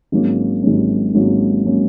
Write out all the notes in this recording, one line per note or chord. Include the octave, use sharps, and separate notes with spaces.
G#1 G#2 F#3 A#3 C#4
G#1 G#2 F#3 A#3 C#4
G#1 G#2 F#3 A#3 C#4
F#3 A#3 C#4